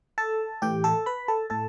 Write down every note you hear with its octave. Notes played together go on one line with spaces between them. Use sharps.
A4 A5
A2 E3 G4 G5
A4 A5
B4 B5
A4 A5
A2 A4 A5